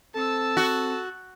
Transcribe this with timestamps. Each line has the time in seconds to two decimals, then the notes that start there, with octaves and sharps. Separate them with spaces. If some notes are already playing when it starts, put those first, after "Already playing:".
0.15 C4 A4 A5 E6
0.57 F#4